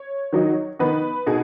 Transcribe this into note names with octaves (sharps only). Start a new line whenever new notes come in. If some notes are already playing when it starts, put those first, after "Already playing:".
Already playing: C#5
D#3 F#3 D#4
D#3 B3 D#4 B4
B2 B3 D#4 G#4